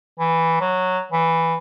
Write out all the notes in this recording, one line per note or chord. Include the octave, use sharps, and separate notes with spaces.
E3
F#3
E3